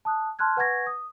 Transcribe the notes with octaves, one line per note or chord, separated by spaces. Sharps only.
A5 D#6 F#6
A5 C6 F6 F#6 G#6
B4 F#5 G#5 C#6 G#6 A#6
D#6